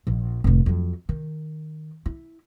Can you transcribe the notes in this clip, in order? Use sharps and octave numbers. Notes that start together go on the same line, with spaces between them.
A#1 F3
F1 A2
F2 F#3
D#3
E4